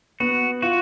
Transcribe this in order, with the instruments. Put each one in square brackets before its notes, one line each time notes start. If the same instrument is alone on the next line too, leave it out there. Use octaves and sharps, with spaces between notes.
[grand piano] B3 [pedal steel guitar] F#4
[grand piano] F4 [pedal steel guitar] F#4